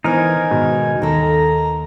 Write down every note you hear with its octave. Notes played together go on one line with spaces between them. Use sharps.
E3 B3 D#4 A#4 C5 G#5
G#2 B2 D#3
D#2 A#3 A4 A#5